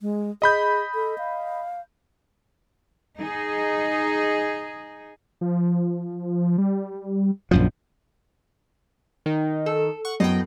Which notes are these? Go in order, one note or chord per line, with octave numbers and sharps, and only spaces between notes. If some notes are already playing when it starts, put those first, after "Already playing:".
G#3
G#4 D#5 B5 G6
A4
F5
D#4 G#4
F3
G3
A#1 F#2 F3
D#3 D#4
A4
F#5 C#6
F#2 A2 B3 D#5 G5